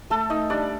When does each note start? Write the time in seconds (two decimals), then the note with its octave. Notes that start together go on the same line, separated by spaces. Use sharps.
0.10 A3 A4 A5
0.30 A3 D#4 D#5
0.50 G3 D4 D5